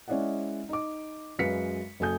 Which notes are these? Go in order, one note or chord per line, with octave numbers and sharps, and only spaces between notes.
G#3 C#4 E4 D5 D#5 F#5
D#4 D6
F#2 G#3 B4 F5 B6 C#7
F#1 F#3 A4 G#5 D#6 G6